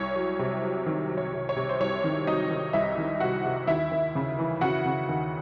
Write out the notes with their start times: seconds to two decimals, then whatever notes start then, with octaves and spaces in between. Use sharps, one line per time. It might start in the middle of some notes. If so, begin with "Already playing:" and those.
Already playing: C2 C#5
0.16 F#3
0.39 C3
0.63 F#3
0.86 D#3
1.09 F#3
1.18 C#5
1.33 C3
1.49 C#5
1.56 C3
1.69 C5
1.80 C2 C#5
2.04 D#3
2.27 F#3 D#4 D#5
2.50 D#3
2.73 C2 E4 E5
2.98 D#3
3.20 C3 F#4 F#5
3.44 C3
3.67 D#2 E4 E5
3.91 D#2
4.15 C#3
4.39 E3
4.61 C#3 F#4 F#5
4.86 C#3
5.09 D#2